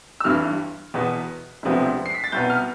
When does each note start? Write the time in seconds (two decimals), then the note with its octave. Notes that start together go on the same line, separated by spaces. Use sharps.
0.20 E6
0.24 G1 G2 E3 G3 F6
0.94 E2 B2 B3
1.63 E1 D2 C3 F3 B3
2.06 C7
2.15 B6
2.24 A6
2.32 C2 B2 B3 G6
2.50 F6